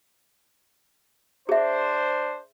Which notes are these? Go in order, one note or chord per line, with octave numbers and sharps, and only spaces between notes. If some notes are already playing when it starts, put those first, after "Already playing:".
D4 G#4 C5 E5